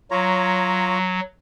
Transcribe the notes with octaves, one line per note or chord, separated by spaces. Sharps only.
F#3 F4 C#5 A#5